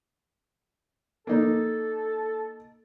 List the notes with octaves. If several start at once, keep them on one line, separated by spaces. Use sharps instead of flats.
A#3 D#4 A4